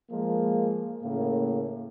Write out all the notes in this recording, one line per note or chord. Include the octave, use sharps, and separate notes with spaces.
F3 G#3 A#3
A2 C#3 A#3